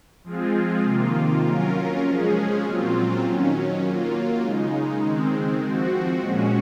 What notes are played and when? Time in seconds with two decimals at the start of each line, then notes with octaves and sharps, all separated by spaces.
0.24 F3 G#3 C4 F4 G#4
0.83 C3 D#3 A#3 F4
1.44 F#3 C#4 F4 A#4
2.03 F3 G#3 C#4 G#4
2.63 A#2 F#3 C4 F4
3.23 D#3 F#3 C#4
3.82 F#3 A#3 F4
4.42 C#3 G#3 D#4
5.01 D#3 G#3 C4
5.62 F3 C4 F#4
6.21 A#2 G#3 C#4 F#4